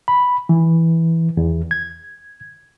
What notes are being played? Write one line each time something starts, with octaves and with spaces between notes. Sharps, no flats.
B5
E3
E2
G#6